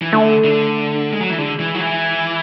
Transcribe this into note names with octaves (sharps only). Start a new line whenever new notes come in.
E3
D3 A3
D3
G#3
F#3
E3
D3 G#3
E3
F#3
E3